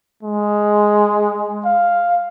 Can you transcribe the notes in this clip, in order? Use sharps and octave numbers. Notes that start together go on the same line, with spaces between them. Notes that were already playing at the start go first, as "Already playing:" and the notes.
G#3
F5